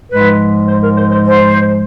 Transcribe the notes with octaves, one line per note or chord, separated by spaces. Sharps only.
G#2 F3 G#3 B4
C5
A#4
C5
C5
C5